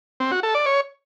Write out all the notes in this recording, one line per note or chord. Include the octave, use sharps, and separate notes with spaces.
C4
F#4
A4
D5
C#5